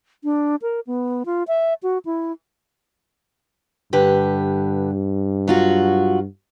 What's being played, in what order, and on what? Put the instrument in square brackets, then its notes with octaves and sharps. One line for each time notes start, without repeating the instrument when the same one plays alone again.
[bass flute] D4
A#4
B3
F4
E5
F#4
E4
[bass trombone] G2 [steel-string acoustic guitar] D3 G4 B4
[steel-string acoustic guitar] F#3 F4 F#4